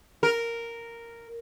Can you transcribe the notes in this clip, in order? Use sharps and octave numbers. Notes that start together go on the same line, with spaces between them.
A#4